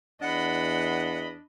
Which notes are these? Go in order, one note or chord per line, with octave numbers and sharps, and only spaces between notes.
E2 D4 D#5 F#5 B5